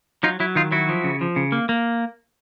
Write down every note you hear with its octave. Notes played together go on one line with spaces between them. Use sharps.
F#3 D#4 F4
F#3 E4
D#3 D#4 F4
F#3 E4 F#4
F3
C#3
F3
C#3
A#3
A#3